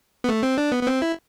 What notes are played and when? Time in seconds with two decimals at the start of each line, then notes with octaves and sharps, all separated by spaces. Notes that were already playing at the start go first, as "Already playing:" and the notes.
0.24 B3
0.29 A3
0.43 C4
0.58 D4
0.72 B3
0.83 B3
0.87 C4
1.02 E4